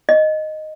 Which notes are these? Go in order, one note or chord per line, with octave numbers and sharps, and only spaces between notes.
D#5